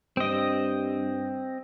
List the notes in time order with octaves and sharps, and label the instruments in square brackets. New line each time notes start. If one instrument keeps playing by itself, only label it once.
[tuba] G2 [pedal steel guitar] C4 D#5